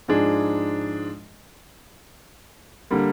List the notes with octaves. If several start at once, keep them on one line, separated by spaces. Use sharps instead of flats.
G#2 F3 G#3 D4 G#4
D3 G3 A#3